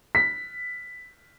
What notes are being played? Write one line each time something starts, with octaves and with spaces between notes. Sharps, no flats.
B6